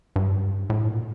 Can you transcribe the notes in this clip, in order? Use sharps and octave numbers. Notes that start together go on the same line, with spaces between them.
G2
A2
A#2